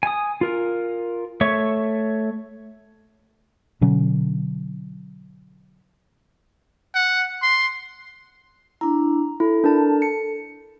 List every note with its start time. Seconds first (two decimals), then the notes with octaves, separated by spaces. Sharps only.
0.03 G#5 D#6
0.41 F4 A#4
1.41 A3 C#5 E5 C#6
3.81 B2 D3 F#3 C#4
6.95 F#5
7.42 C6
8.81 D4 E4 A#5
9.40 E4 A4
9.64 D4 A#4 A5
10.02 C#7